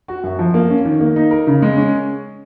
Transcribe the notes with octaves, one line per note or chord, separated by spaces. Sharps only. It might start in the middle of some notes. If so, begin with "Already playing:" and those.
F#4
F#2
F3
A#3
C#4
D#3
A#3
D#4
A#4
C#3
G#3
C#4